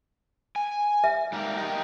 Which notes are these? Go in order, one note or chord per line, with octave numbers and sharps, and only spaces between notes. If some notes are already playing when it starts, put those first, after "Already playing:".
G#5
E5
G#2 G3 A#3
G4 A#4 D#5